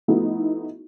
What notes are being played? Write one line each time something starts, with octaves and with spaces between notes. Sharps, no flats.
F3 A3 B3 D#4 E4 F#4